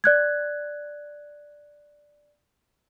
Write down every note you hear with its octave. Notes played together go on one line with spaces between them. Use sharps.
D5 F#6 G#6